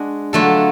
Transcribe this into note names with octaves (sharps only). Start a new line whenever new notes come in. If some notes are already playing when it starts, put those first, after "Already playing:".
Already playing: G#3 D4 F#4
D3 F#3 A3 F4 A4